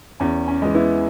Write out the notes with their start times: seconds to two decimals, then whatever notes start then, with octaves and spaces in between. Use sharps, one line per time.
0.20 E2 C#4
0.48 C#4
0.62 E3 G#3
0.75 B3 E4